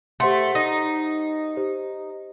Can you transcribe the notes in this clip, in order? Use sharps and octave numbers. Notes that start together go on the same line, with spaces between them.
A3 G4 C5 F#5 C6
D#4
G4 C5 D#5